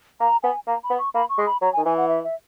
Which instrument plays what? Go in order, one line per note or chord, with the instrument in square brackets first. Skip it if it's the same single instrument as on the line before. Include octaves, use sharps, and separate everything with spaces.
[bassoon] A#3 [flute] A#5
[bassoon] B3 [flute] G#5
[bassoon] A#3 [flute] A#5
[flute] B5
[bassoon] B3
[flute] C#6
[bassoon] A#3 [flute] B5
[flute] C#6
[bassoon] G#3
[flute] B5
[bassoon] F#3 [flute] A#5
[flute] G#5
[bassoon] D#3
[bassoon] E3 [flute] G#5
[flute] F#5
E5
E5